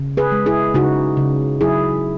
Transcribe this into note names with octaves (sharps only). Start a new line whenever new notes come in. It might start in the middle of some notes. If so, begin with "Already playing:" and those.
Already playing: C#3
G#4 B4
G#3
E4 G#4
C#3 D#4 F#4
C#3
F#3 E4 G#4